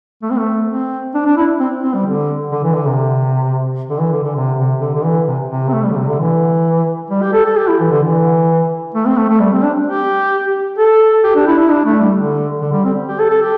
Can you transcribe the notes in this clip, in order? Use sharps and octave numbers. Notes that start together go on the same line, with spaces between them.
A3
C4
A3
C4
D4
D4
E4
C4
C4
G3
D3
D3
E3
D3
C3
D3
E3
D3
D3
C3
C3
D3
D3
E3
C3
C3
C4
A3
G3
D3
C3
D3
E3
G3
G4
A4
A4
G4
E4
E3
D3
E3
A3
C4
A3
A3
G3
C4
D4
G4
A4
G4
D4
E4
E4
D4
A3
G3
D3
D3
G3
C4
G4
A4
A4
G4